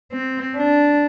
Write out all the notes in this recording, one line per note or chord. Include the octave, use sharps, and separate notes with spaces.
C4
D4